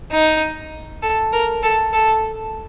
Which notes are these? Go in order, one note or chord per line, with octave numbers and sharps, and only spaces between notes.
D#4
A4
A#4
A4
A4